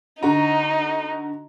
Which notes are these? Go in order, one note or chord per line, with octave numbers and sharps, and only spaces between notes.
D3 D#4 F#4 A#5